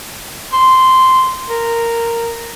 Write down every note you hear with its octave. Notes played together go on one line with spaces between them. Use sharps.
C6
A#4